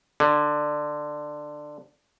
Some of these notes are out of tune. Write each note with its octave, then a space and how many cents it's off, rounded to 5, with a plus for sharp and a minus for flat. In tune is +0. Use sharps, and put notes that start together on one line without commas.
D3 +15